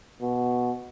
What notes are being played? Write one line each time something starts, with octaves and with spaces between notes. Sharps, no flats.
B2